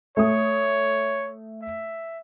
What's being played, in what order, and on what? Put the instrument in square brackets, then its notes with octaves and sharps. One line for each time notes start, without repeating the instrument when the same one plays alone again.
[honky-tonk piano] A3 D#6 [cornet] C#5
[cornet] E5